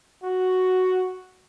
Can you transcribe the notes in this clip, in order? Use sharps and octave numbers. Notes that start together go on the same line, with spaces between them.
F#4